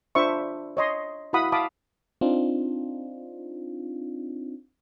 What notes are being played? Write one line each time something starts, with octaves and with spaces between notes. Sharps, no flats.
D4 F4 C5 E5 B5 C#6
C#5 D#5 C6
E4 F#4 F5 F#5 B5 D#6
F5 A5 B5 D6 D#6
C4 D4 D#4 F4